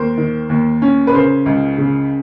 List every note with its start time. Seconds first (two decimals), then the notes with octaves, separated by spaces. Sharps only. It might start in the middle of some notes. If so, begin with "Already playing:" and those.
Already playing: D#2 A#4 C5
0.18 D#3
0.50 D#2
0.82 C#4
1.07 B4
1.14 C#3 A#4 C5
1.46 C#2
1.78 C#3